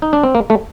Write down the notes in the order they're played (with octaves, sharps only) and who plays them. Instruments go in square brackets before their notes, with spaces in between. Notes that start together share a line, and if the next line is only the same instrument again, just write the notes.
[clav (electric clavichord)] D#4
D4
C4
A#3
A3